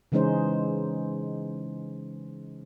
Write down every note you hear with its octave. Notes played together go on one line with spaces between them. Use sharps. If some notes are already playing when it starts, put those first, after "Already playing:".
C#3 E3 G#3 C#4 D#4 C5